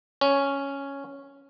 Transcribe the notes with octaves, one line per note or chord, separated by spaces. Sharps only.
C#4